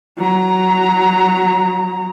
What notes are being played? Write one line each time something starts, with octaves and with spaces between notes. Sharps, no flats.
F#3 A#5